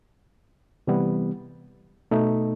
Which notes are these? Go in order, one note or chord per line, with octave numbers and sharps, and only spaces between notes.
C3 E3 G3 B3
B2 A3 D#4